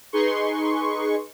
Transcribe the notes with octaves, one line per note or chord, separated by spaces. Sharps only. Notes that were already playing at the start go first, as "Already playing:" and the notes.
D#4 G#4 B4 C6 C#6